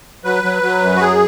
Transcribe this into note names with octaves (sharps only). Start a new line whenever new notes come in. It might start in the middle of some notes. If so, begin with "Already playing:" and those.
F#3 B4
F#3
F#3
F#2
F#4
F#3 G#4